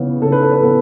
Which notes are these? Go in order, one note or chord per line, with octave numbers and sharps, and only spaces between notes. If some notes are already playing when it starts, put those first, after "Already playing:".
Already playing: C#3 E3 B3
C#3 A4
B4
A4
B4
E3 B3 A4